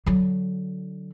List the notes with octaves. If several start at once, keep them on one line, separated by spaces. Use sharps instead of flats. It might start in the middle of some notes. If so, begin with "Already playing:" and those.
D3 F#3